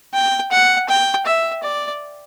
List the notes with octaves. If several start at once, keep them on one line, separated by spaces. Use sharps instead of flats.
G5
F#5
G5
E5
D5